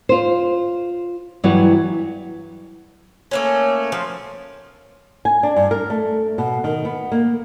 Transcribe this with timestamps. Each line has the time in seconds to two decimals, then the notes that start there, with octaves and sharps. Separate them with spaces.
0.09 F4 C5
1.44 G2 E3 F#3 B3 F#5
3.31 A3 A#3 C#4
3.92 F3
5.25 G#5
5.43 D4
5.56 G2
5.71 A#4
5.90 A3
6.38 B2
6.64 D#3
6.85 B3
7.12 A#3